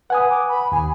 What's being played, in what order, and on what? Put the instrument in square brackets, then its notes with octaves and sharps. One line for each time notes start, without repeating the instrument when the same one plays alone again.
[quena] B4 [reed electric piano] F#5 G#5 D#6
[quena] D6
B5
[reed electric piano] D#2 [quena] G#5